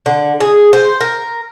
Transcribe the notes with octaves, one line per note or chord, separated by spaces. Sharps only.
D3
G#4
C5
A#4